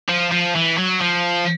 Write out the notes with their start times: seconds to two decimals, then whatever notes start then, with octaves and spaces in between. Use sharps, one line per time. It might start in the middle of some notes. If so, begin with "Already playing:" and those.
0.09 F3
0.32 F3
0.55 E3
0.78 F#3
1.01 F3